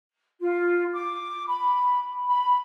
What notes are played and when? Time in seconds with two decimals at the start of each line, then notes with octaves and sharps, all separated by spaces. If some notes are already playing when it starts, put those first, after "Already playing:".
0.41 F4
0.92 D6
1.48 B5
2.29 B5